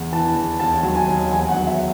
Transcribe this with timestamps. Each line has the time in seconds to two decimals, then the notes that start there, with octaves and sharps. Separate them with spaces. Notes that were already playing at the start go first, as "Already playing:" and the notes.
Already playing: E2
0.12 E3 A5
0.36 E2
0.60 D#2 A5
0.83 F#3
0.95 G#5
1.07 D#2
1.32 E2 G#5
1.49 F#5
1.54 F#3
1.67 E5